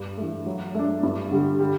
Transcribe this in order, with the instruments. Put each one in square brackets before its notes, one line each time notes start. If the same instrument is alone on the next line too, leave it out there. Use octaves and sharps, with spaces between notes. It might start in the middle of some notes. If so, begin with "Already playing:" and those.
Already playing: [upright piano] G2
E3 A3
F#3
A3 D4
G2
D3 G3
G3